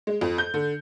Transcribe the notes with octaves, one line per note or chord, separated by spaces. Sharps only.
G#3
F2
G6
D3